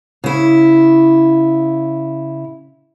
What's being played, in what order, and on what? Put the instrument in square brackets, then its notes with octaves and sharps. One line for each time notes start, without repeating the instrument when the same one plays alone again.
[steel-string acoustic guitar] C#3 E4